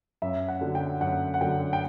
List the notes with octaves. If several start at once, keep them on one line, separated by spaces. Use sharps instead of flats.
F#2 E5
F#5
D3 F#3
G5
F#2 F#5
F#5
D3 F#3 G5
G5